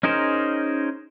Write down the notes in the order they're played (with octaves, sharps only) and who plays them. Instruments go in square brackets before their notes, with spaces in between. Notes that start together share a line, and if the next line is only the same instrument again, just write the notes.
[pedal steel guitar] C#4 D#4 G#4 A#4 C5